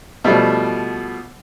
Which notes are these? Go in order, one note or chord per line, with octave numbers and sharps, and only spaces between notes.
B2 F3 G3 A3